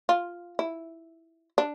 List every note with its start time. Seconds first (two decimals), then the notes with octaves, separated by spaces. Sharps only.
0.09 F4
0.59 E4
1.58 D4